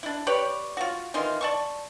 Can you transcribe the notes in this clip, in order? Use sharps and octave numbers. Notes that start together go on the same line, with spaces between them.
D4 E4
G4 B4 C#5 D5
F4 F#4
D#3 E3 F4 C6
D5 A5 C#6